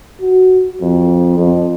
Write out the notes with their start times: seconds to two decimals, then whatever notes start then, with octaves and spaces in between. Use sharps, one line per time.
0.21 F#4
0.81 F2
1.38 F2